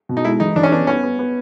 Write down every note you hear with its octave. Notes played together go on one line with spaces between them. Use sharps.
B2
D#4
G#3 E4
E3 D#4
E3 D4
C#4
B3 D4
B3 C#4
B3
B3